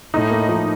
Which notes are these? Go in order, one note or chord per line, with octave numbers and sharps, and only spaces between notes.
A2 D#4
A#3
F3